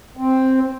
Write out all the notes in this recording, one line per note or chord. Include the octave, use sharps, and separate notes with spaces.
C4